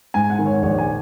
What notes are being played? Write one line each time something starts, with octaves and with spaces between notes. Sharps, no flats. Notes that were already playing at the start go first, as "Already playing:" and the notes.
G#2 G#5
F#5
D#3
C#5
A#1 C#5
G#5